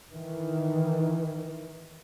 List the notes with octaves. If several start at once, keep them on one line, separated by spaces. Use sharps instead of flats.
D#3 E3